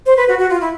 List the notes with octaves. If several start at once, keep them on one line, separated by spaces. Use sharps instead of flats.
C5
B4
F#4
F#4
F4
E4